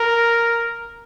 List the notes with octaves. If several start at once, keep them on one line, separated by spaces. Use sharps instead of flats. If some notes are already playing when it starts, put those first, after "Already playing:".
Already playing: A#4